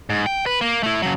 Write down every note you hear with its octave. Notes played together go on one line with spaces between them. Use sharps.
G#2
G5
B4
A#3
A3 E4
C#3 F#3